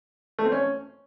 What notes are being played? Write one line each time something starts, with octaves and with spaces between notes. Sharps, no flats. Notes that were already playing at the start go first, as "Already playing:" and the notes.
A3
C4
C#4